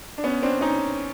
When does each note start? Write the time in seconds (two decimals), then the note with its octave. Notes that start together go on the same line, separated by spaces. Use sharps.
0.18 D4
0.24 B3 C#4
0.43 C4 D4
0.61 C#4 D#4